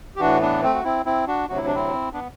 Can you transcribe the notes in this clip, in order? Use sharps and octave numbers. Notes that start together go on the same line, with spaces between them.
G4
A2 E3 D4 F#4
B3 D4
A3 C4
F#4
C4 E4
C4 E4
D4 F#4
D2 C3 F#3 F#4
E4
D4
C4 E4
B3 D4